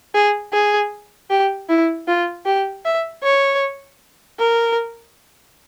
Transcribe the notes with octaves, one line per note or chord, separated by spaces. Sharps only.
G#4
G#4
G4
E4
F4
G4
E5
C#5
A#4